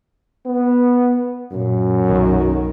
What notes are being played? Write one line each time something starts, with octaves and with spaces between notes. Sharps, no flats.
B3
F#2 A#2
B1 D#3 F#3